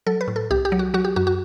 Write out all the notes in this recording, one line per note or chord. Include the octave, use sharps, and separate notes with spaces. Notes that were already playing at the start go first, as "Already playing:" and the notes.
F#3 A4
B4
A2
A4
C2 G4
G4
F#3
F#4
F#3 F#4
G4
F#2 F#4
F#4